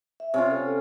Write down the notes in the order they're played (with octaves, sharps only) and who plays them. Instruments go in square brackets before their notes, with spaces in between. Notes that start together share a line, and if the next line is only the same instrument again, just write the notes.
[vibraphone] E5
[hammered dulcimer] C3 C#4 F4
[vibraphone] A4